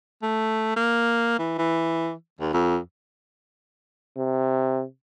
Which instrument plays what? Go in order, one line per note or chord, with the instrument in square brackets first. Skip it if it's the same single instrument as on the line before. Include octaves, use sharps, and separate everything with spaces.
[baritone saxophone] A3
A#3
E3
E3
D#2
F2
[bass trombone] C3